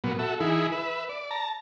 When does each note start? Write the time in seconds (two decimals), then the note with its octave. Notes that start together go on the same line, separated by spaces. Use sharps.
0.04 A#2 F#3 B3
0.19 F#4 A4 E5
0.40 E3 D#4 E4 G#4
0.72 B4 E5
1.09 D5
1.31 A5 A#5